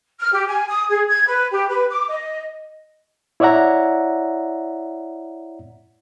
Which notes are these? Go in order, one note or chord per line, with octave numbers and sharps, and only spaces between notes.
F6
G4
G#5
D#6
G#4
G#6
B4
G4
B4
D6
D#5
E4 C#5 D5 E5 F#5 A#5